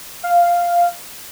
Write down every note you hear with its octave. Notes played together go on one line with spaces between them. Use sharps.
F5